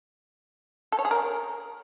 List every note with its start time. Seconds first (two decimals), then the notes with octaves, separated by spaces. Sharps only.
0.92 A4
0.99 C#5
1.05 G#4
1.11 A#4